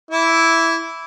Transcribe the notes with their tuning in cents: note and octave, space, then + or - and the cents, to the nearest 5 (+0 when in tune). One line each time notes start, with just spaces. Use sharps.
E4 +0 E5 +0 D6 -30